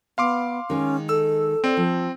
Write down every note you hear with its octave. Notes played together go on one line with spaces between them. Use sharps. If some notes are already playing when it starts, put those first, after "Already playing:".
B3 F5 C6 D6
D#3 G#3 C#4
A4 E6
C4 D5
F3